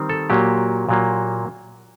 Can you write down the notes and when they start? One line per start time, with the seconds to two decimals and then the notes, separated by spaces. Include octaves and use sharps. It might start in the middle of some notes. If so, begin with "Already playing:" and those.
Already playing: D#3 G3 C4
0.09 A4
0.30 A#2 F#3 A#3 G4
0.89 A#2 F#3 A#3